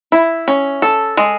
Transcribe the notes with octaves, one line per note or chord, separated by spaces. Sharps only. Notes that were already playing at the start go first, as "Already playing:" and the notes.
E4
C#4
A4
G#3